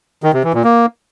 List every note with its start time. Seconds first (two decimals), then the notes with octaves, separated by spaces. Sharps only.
0.23 D#3
0.33 C3
0.44 E3
0.54 A#2
0.64 A#3